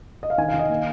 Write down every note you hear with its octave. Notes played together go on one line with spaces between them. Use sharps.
D#5
F5
D#3 G#5
F5
D#3
D#5
A#3